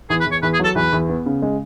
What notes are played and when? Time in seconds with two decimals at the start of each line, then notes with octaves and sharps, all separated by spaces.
0.10 E2 G#4
0.20 B4
0.26 E2
0.32 C#5
0.42 E2 B4
0.53 G#4
0.59 F#3 A4
0.75 E2 B4
0.93 E2
1.09 B3
1.26 C#3
1.42 G#3